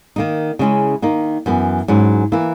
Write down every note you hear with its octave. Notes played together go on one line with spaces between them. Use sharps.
D#3 A#3 D#4
C#3 G#3 C#4 E4
D#3 A#3 D#4
F#2 E3 B3
G#2 F#3 C#4 E4
E3 A#3 E4